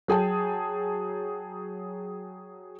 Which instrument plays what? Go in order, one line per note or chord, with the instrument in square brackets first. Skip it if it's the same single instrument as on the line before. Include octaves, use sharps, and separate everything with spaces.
[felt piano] F#3 G#4 G5 A5